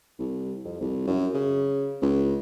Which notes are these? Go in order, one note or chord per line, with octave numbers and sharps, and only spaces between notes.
C2
F2
C2
F#2
C#3
C#2